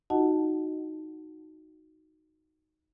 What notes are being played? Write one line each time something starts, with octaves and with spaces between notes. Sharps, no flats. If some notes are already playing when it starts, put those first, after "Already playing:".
D#4 F4 F#4 D#5 F#5 A5